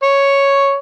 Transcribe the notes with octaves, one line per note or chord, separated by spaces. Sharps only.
C#5